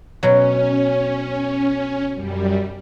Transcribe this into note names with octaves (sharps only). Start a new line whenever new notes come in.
B2 F#3 C#4
F#2 G3